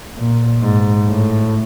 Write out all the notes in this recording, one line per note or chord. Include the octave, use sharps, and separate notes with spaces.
A#2
G#2
A2